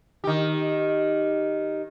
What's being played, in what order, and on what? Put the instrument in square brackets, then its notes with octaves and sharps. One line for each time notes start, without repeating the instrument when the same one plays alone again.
[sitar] D#3 G4